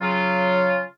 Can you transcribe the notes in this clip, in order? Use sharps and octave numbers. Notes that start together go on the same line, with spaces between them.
C#3 F#3 F4